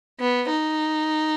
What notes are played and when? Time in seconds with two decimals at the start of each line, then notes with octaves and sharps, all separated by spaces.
0.20 B3
0.49 D#4